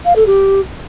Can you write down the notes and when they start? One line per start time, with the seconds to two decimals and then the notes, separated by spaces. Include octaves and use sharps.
0.05 F5
0.16 A4
0.26 G4